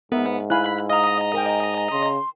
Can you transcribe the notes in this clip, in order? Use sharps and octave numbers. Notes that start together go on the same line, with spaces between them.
G#2 B3 A#4 E5
E4 F5 G#5 B5 F#6
D#5 F5 A#5 D#6
A#4 G5 G#5
C#3 C6